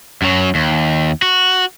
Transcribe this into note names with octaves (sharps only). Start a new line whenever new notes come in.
F#2 F#3
D#2
F#4